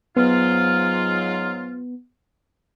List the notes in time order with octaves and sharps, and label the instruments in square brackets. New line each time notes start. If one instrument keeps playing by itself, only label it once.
[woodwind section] G#2 F#3 F4 [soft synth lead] B3